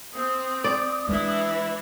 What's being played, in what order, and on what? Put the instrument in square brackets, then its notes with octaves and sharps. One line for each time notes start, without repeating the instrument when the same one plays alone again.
[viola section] C4 [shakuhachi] D#6
[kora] D5
[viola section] E3 D4 E4 [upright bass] G#3